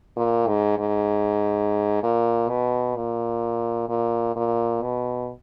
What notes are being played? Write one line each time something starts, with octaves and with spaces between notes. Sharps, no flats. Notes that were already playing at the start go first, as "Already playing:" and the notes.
A#2
G#2
G#2
A#2
B2
A#2
A#2
A#2
B2